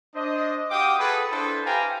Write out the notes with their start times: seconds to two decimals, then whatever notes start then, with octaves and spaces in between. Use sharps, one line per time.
0.15 D4 C5 D#5
0.70 F#4 G4 F5 G5 D6 D#6
0.99 F#4 G#4 A4 B4
1.31 D4 E4 A4 B4 C5
1.65 G4 B4 F5 G5 G#5 A#5